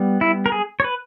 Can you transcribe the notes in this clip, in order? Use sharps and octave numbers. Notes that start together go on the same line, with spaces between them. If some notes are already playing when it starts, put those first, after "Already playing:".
Already playing: G3 B3
E4
A#4
G#4
C#5
B4